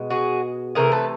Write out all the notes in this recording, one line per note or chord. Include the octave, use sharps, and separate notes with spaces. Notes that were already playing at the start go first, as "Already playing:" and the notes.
Already playing: B2 G#3
F#4 G#4
C3 E3 A3 G#4 A#4
A4 B4